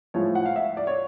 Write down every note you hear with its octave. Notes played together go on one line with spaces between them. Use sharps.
A2 F3 G#3 C#5
F#5
F5
E5
D5
C#5